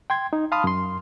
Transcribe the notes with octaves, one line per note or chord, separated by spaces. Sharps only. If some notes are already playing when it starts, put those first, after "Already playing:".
G5 C6 G#6
D#4
F5 A5 B5 C6 D#6 F6
F#2 C6